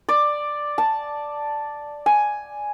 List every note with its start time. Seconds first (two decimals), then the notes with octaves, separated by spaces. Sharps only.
0.09 D5
0.78 A5
2.06 G#5